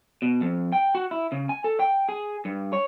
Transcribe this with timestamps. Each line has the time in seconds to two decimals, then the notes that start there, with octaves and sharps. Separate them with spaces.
0.22 B2
0.41 F2
0.72 G5
0.95 F#4
1.11 E4
1.32 C#3
1.49 G#5
1.64 A4
1.79 G5
2.09 G#4
2.45 G2
2.73 C#5